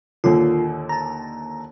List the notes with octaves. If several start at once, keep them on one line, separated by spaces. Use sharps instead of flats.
D#2 A#2 D3 F4
A5 A#5